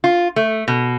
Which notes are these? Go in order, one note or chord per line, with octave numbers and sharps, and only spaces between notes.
F4
A3
B2